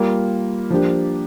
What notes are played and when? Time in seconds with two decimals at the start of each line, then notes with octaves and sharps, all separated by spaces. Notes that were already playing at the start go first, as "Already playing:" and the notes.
Already playing: G3 A#3 F4
0.70 F3 A#3 D4 G4